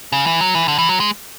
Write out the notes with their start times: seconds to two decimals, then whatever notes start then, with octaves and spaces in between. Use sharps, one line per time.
0.12 C#3
0.27 E3
0.41 F#3
0.55 E3
0.68 D3
0.78 E3
0.89 F#3
1.00 G#3